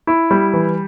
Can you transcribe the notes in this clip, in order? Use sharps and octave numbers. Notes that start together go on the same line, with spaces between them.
E4
G3
E3